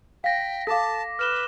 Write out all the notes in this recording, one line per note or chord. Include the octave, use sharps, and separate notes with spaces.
F5 G5 A#6 B6
A4 F5 A5 D6 A#6
B4 F6 E7 G7